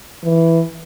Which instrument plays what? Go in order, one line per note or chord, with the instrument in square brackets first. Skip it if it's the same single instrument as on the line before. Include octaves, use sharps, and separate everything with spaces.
[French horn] E3